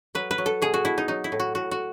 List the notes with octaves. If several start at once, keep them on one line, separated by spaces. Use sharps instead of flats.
F#3 B4
B4
F#3
A4
B2 G#4
F#4
B2 E4
D#4
F#3 D#4
E4
A2
F#4
A2 F#4
F#4